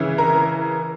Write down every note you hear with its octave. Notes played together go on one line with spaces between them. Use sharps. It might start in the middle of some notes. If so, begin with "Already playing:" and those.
Already playing: C#3 E3
A#4 A#5